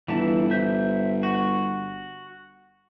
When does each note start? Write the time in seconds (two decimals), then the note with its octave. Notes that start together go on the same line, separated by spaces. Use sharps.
0.08 G1 E3 E4 A5
0.51 C5 E5 G6
1.23 F#4